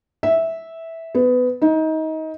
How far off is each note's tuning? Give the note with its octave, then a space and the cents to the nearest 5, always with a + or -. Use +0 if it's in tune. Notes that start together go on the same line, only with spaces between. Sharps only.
E5 -10
B3 +20
D#4 +25